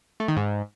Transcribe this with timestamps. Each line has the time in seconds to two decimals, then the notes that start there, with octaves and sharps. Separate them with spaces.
0.20 A3
0.28 D#3
0.37 G#2